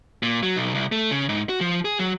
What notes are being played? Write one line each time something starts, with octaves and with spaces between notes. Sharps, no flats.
A#2
F#3
B1
C2
A3
C#3
G#2
F#4
F3
G#4
F#3